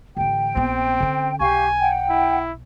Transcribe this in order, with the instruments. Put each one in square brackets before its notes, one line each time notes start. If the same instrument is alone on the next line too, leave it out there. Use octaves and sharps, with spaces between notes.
[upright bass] A1 D3 [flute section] G5
[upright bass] A#1 B3 [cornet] C4
[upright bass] D3 C#4
[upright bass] B1 [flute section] G4 F5 C#6 [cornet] G#5
[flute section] F#5 G5
[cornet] E4